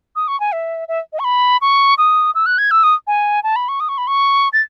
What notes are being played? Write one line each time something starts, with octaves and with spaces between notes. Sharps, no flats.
D#6
C#6
G#5
E5
E5
D#5
C#6
B5
C#6
D#6
E6
F#6
G#6
E6
D#6
G#5
A5
B5
C#6
D#6
C#6
B5
C#6
A6